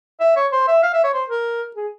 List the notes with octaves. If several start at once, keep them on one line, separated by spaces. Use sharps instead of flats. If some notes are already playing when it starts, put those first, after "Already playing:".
E5
C#5
C5
E5
F5
E5
C#5
C5
A#4
G#4